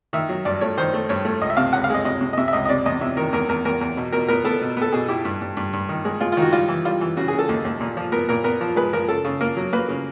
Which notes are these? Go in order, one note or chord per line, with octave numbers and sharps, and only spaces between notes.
D#3 E5
F#3
G2 D5
A3 C#5
D#3 C5
A3
G2 C#5
A3
C#2 D#5
E5
C3 F5
C#2 F#5
F5
G#3 D#5
C3 D#5
C3
D#5
C3 E5
E5
C#2 D#5
D#5
C3 D5
E2 D#5
C3 E5
D#3 A#4
E2 A#4
E2 A#4
E2 A#4
E2
B2
B2 A#4
B3 A#4
B3 A4
B2
B3 A4
B2 G#4
E4 G4
G2
G2
G2
G2
D#3
G#3
G#3 F4
D#3 F4
F#4
G3 F4
E3
G3 F4
E3
C#3 F#4
C#3 G#4
A4
D#2
D#2
A#2
F3
B3 A#4
A#2 A#4
B3 A#4
F3
G#3 B4
F3 A#4
C#3 A4
C#3
A#3 A#4
F#3
A#3 B4
C#3